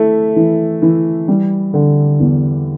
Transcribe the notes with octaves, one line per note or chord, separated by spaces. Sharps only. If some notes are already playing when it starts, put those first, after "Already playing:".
Already playing: A3 E4
E3
E3
G3
D3
E2